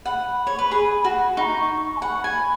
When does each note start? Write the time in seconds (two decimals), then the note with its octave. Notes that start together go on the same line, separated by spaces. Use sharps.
0.05 F#5 B5
0.47 C#5
0.59 B4
0.71 G#4
1.04 F#4
1.37 D#4 C#6
1.70 C#6
1.96 G#5
2.02 F#5 B5
2.24 G#5